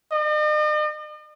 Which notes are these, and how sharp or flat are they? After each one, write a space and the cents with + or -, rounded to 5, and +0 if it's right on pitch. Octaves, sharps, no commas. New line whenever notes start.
D#5 -45